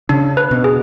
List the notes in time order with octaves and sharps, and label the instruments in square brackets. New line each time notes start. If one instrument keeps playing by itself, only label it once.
[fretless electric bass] C#3 [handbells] D4
[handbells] B4
[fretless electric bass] B2
[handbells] G#4